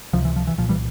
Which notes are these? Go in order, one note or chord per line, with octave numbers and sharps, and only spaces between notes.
C#2 C3 F3
E3
F3
E3
C2 A#2 F3
E3 G3